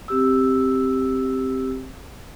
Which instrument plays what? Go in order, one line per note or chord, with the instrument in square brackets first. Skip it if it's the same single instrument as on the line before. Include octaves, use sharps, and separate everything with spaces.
[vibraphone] C4 G4 E6